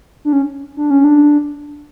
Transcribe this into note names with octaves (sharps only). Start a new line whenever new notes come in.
D4
C#4
D4
C#4
D4